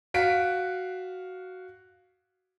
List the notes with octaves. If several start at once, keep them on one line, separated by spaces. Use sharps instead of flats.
F#4 F5 B6 D7